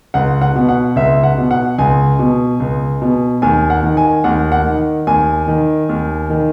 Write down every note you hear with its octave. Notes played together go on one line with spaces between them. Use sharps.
C#2 F#5
F#5
B2
F#5
C#2 E5
F#5
B2
F#5
C#2 G#5
B2
C#2
B2
D#2 G#5
F#5
D#3
G#5
D#2 F#5
F#5
D#3
D#2 G#5
D#3
D#2
D#3